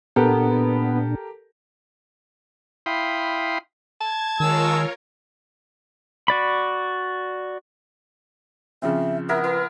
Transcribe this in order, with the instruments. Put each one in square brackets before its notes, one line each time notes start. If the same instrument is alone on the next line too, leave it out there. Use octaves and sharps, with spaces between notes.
[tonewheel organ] A#2 D4 [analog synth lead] B3 [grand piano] G4 A4 A#4
[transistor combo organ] E4 F5 G5 B5 C6 D#6
[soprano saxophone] A5 [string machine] G#6
[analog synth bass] D#3 [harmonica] G#3 G#4 E6 [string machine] F4 A#4 C#5
[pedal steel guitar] F#4 D5 B5
[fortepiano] C#3 F3 C4 [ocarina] E5
[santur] B3 E4 A#4 [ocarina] E5
[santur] E4 [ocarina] B4